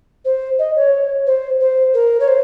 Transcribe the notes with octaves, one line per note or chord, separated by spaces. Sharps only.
C5
D#5
C#5
C5
C5
A#4
C#5
C5